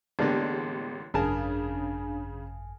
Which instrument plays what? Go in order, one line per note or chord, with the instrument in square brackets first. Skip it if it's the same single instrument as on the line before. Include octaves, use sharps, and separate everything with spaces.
[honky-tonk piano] A1 G#3 D5 [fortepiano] D3 A#3 D4 [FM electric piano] B3 G4
[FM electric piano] G#1 F#2 G#5 [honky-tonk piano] C#3 [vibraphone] D4 [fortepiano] G#4 A#4 A5